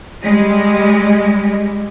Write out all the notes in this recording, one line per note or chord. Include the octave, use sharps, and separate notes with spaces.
G3 G#3